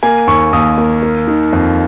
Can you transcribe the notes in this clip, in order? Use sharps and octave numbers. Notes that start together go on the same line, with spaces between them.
A#3 G#5
D#2 C#6
D#2 D#6
A#3
A#3
D#3
F2